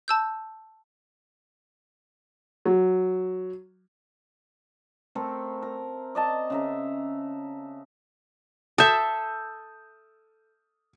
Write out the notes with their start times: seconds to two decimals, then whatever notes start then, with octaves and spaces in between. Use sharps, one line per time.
0.08 A5 E6 G6
2.65 F#3
5.15 A3 C4 A4 A#4
5.62 A#4
6.15 D5 D#5 A5
6.50 C#3 E5 A#5
8.78 A4 E5 D#6 G6 E7